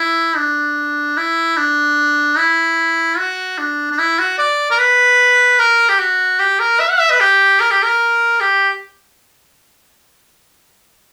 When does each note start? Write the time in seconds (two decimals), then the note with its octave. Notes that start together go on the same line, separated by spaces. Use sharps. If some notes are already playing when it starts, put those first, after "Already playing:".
Already playing: E4
0.36 D4
1.17 E4
1.56 D4
2.37 E4
3.18 F#4
3.58 D4
3.91 D4
3.99 E4
4.19 F#4
4.38 D5
4.71 A#4
4.78 B4
5.59 A#4
5.89 G4
5.99 F#4
6.39 G4
6.59 A#4
6.79 E5
6.90 F#5
7.00 E5
7.10 B4
7.20 G4
7.60 A#4
7.71 G4
7.82 A#4
8.40 G4